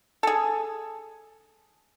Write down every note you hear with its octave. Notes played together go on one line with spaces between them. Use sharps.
G#4 A4